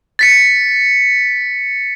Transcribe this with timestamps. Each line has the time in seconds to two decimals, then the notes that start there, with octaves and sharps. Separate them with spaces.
0.19 A6 B6 C#7